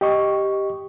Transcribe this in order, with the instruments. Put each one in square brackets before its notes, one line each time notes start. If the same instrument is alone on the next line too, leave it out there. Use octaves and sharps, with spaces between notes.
[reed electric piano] G4 D#5 C#6